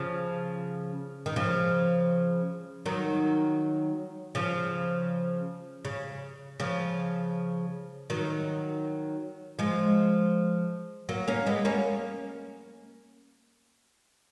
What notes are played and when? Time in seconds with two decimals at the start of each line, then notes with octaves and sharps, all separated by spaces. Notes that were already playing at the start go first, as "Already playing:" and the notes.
Already playing: C#3 F3
1.26 D#3
1.36 C#3 F3
2.86 D#3 F#3
4.35 C#3 F3
5.85 C#3
6.60 C#3 F3
8.10 D#3 F#3
9.59 F3 G#3
11.09 F#3 A#3
11.28 A#3 C#4
11.46 G#3 B3
11.65 A#3 C#4